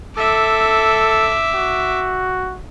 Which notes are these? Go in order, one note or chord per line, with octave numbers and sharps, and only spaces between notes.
A4 E5 D6
F#4